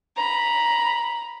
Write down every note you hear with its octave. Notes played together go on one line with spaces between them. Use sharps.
A#5 B5